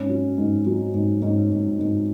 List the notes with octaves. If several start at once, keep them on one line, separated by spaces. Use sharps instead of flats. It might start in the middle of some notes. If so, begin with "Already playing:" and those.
Already playing: G#2 C#4
F#3
G#2
F#3
G#2
G#2
G#2
G#2